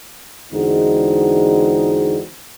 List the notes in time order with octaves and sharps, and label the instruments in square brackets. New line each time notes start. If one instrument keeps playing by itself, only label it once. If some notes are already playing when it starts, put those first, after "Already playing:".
[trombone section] E2 D3 G#3 C4 D#4 F#4